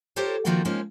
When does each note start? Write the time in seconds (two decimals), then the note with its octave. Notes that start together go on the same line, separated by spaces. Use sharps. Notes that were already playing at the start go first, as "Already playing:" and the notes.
0.16 F4 G4 A4 A#4 C5 C#5
0.45 D#3 F3 A#3 F#4 A4 A#4
0.65 D#3 F3 G#3 A#3 C#4